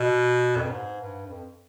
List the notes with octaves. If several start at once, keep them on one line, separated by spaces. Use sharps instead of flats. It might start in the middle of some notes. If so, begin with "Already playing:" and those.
Already playing: B2
F2
G2
G#2
G2
G2
F2